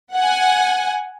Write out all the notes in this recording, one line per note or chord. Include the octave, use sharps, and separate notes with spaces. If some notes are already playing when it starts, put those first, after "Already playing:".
F#5 G#5